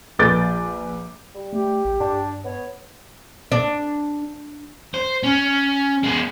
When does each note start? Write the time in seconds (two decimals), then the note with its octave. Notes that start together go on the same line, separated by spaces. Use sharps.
0.19 A#1 B4 D6 G6 A6
1.35 G3
1.53 A3 G4
1.85 A1
2.00 G2 D4
2.45 B3 C#5
3.52 D4
4.94 C5
5.23 C#4
6.03 G#3 B3